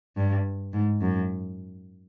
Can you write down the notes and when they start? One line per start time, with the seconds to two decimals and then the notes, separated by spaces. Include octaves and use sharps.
0.17 G2
0.73 G#2
1.01 F#2